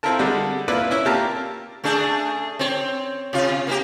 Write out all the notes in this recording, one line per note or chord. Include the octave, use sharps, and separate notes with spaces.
C4 E4 F4 A4 A#4 A5
D3 G3 G#3
A#3 E4 F4 B4 D5
C#4 E4 E5
A#3 F4 G4 F5 A5 A#5
A3 D4 G#4
C4 C#5
C3 F4
A#3 E4 G4